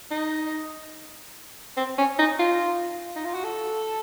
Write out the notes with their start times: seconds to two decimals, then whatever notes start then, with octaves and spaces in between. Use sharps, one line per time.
0.11 D#4
1.77 C4
1.98 C#4
2.19 D#4
2.39 F4
3.16 D#4
3.25 F4
3.34 F#4
3.44 A4